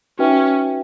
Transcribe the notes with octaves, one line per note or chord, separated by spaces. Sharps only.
C#4 D#4 F#4 B4 E5 G5